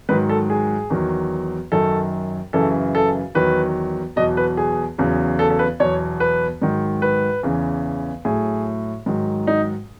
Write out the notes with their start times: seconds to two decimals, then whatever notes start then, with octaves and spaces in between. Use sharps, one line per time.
0.09 G#2 D#3 F#3 B4
0.29 A4
0.50 G#4
0.90 E2 D#3 F#3
1.72 F#2 D#3 F#3 A4
2.53 F#2 C#3 E3 A4
2.95 A4
3.35 E2 D#3 F#3 B4
4.16 E2 B2 F#3 D#5
4.37 B4
4.57 G#4
4.98 E2 C#3 F#3
5.39 A4
5.50 A4
5.59 B4
5.80 E2 B2 F#3 C#5
6.20 B4
6.62 G#2 D#3 F#3
7.02 B4
7.43 E2 C#3 E3
8.25 A2 F#3 G#4
9.06 G#2 D#3 F#3
9.47 D#4